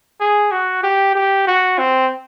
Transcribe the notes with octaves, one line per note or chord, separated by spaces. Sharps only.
G#4
F#4
G4
G4
F#4
C4